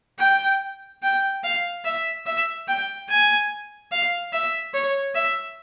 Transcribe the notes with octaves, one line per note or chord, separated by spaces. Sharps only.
G5
G5
F5
E5
E5
G5
G#5
F5
E5
C#5
E5